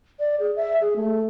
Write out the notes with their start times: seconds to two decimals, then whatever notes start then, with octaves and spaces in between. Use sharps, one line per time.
0.20 D5
0.40 G#4
0.56 E5
0.81 G#4
0.96 A3